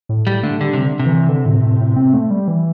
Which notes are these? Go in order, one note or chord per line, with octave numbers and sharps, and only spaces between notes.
A2
A2 G3
D3 A3
D3 G3
C3
D3
C3
E3
D3
A2
A2
A2
C4
A3
G3
E3